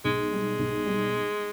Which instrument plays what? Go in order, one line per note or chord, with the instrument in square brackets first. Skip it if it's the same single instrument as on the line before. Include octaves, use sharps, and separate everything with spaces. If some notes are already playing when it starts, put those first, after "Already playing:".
[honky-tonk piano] B1 [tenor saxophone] G#3
[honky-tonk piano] G3
B1
G3